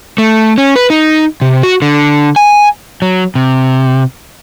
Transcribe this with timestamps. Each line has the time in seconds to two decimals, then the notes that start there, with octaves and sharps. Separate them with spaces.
0.18 A3
0.58 C#4
0.76 B4
0.90 D#4
1.41 C3
1.63 F#4
1.82 D3
2.36 G#5
3.02 F#3
3.35 C3